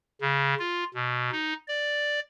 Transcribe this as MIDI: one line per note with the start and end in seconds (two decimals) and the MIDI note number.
0.21 0.54 49
0.59 0.84 65
0.94 1.30 47
1.32 1.53 63
1.68 2.20 74